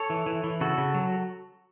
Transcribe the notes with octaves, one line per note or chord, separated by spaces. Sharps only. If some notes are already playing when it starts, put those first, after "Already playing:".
Already playing: A4 C#5
E3
E3
E3
C#3 F#4 A4
C#3
F#3